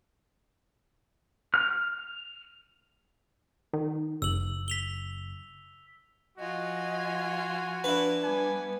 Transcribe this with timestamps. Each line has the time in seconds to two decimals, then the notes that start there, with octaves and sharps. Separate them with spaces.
1.54 F6
3.73 D#3
4.22 F#1 E6 F#7
4.68 B6 F7 G7
6.38 F3 F4 F#4 D#5 G#5
7.84 D4 E4 B4
8.24 G3 B3 G#5